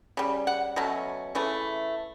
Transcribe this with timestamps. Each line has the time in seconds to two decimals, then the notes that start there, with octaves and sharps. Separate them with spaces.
0.17 C#3 G3
0.47 F#5
0.76 B2 F#3 A3 C#4
1.35 C#3 E3 A3